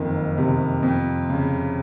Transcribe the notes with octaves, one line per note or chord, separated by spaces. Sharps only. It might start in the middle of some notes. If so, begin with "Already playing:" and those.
Already playing: F#1 F2 D#3
C3
F2
C#3